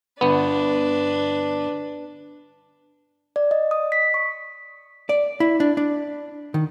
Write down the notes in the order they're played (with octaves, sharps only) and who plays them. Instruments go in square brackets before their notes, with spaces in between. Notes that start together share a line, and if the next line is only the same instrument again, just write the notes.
[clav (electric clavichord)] G1 B3 [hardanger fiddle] D4 B4
[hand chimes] D5
D#5
D#6
B6
C#6
[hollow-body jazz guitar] D5
E4
D4
D4
D#3